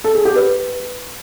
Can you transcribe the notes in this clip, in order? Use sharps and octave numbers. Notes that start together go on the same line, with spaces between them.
A4
G#4
G4
B4